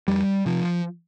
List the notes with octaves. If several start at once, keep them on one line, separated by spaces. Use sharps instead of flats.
F2 G3
C3 F3